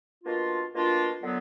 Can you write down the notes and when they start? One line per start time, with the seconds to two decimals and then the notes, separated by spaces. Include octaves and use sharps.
0.24 B2 A#3 D4 F4
0.73 B2 A#3 D4 F4
1.22 D3 F#3 B3